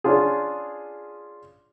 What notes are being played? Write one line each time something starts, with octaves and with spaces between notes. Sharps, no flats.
C#4 D4 F4 G#4